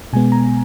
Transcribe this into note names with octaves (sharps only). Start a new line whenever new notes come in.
B2 G#3 B3 G#5
A#5